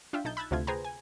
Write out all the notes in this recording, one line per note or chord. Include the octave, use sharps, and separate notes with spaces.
D4 F4 E5 G5
B1 D#4 A5 G6
B5 E6 F#6 G#6 A6
D2 C3 A3 F4 G#6
G#4 B4 C5 G5 G#5 A#5
G#5